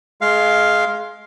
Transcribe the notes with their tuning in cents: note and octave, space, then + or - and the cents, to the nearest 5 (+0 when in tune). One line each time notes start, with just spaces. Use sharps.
G#3 +25 F5 +0